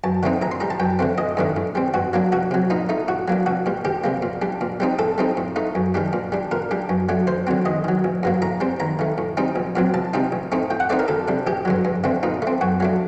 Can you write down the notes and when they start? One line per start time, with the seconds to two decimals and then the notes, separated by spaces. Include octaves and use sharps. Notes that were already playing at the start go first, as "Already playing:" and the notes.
0.04 F#2 A5
0.23 D3 A3 C4 D#4
0.42 A1 A#5
0.51 C6
0.60 A2 G3 A#5
0.70 A5
0.80 F#2 G5
0.99 D3 A3 C4
1.18 A1 D#5
1.37 G2 D#3 A3 D4
1.56 A2
1.75 G3 C4
1.94 G2 F#4
2.13 F#3 A#3 D4
2.32 C2 F#4
2.51 C3 F#3
2.70 A#2 D#4
2.89 A3 D#4
3.08 A2 F#4
3.28 F#3 A#3 D4
3.46 C2 F#4
3.66 A#2 G3
3.85 D2 G4
4.04 C3 G3 A#3
4.22 A#2
4.42 G3 D4
4.61 A#2
4.80 G3 C4 D#4
4.99 A2 A4
5.18 G3 C4 D#4
5.37 A2
5.56 A3 D#4
5.75 F#2
5.94 D#3 G3 D4
6.13 A#2
6.32 G3 D4
6.51 A#2 A#4
6.71 G3 D4
6.89 F#2
7.09 F#3 A3 D4
7.27 D2 C5
7.47 D3 F#3 C4
7.65 D#2 D#5
7.84 D#3 F#3
8.04 A1
8.23 G2 F#3 A#3
8.42 A2 A#5
8.60 G3 C4
8.80 D#2 A#5
8.99 D#3 A3
9.18 A2
9.37 G3 C4 D#4
9.56 A#1
9.76 A#2 F#3 C4
9.94 C2 A5
10.14 C3 G3 C4 D#4
10.32 A1
10.52 A2 A3 C4 D#4
10.70 A2 G5
10.80 F#5
10.90 A3 C4 D#4 D5
10.99 A#4
11.08 D2 A4
11.28 C3 G3 D4
11.47 A1 G4
11.65 G2 D3 F#3
11.85 G2
12.04 D3 A3 C4
12.23 A#2 D#4
12.42 A3 C4
12.61 F#2 F#4
12.80 F#3 A3 D4